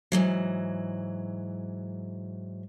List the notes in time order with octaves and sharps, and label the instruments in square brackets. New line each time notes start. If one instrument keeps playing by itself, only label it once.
[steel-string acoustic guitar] G#2 E3 F#3